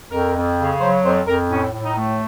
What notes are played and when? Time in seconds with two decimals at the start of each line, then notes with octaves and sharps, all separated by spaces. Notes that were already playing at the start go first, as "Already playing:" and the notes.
0.11 F2 A#4
0.35 F2
0.58 C#3
0.81 F#3 C5
1.03 F2 C5
1.26 F2 A#4
1.50 A2 C#4
1.73 A2
1.84 D#4
1.95 A3